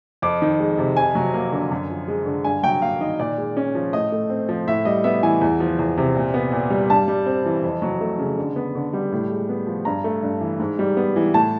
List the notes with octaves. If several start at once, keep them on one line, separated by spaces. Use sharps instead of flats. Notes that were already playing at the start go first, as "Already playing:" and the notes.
F2 D6
D#3
G#3
C3
F2 G#5
F#3
A#3
D3
F#2
F3
G#3
D3
G2 G#5
F#3 G5
A#3 F5
D#3 D#5
A#2 D5
G#3
C#4
F3
A2 D#5
A3
C4
F3
A2 E5
G3 D#5
B3 E5
E3 G#5
E2
F3
E2
C3
A#2
B3
A#2
G3
G2 A5
G3
C4
E3
F2
F#3
A3
C#3
D3
B3
D3
G3
A2
G#3
B3
F3
G2 A#5
A3
G2
E3
G#2
G3
B3
E3
A2 A5